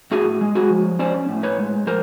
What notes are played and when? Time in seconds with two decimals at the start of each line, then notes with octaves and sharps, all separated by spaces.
0.11 A2 F#4 G#4
0.41 G#3
0.55 F#4 G#4
0.70 F3
0.99 C#4 C5 D5
1.29 A2
1.43 B4 C#5
1.58 G#3
1.87 F3 A#4 C5